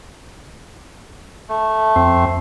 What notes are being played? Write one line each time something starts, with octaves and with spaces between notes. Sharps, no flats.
A3
F2 C4